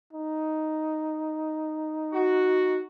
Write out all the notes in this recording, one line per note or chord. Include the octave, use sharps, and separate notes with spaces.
D#4
F#4